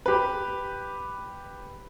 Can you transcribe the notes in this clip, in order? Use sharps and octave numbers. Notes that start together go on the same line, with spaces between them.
G4 B4